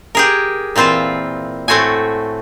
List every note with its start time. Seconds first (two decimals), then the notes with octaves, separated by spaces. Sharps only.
0.15 G4 G#4 A#4
0.76 A#2 E3 C4 F4 C5
1.68 A2 A3 C4 F#4 G#5